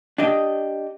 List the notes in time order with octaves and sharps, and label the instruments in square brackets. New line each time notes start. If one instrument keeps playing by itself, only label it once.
[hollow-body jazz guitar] D4 G4 D#5